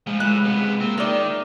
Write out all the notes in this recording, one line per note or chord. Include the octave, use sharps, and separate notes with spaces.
A#2 F3 G#3
A2 G#3 F4 B4 F#6
C3 B3 F4 G#4 B4
A#3 C4 A#4
D#3 D#4 A#4 D5 E5